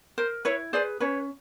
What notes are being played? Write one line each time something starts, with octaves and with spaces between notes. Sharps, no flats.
A#4 C5
E4 B4 C#5
G#4 B4 C5 D5
C#4 B4 C#5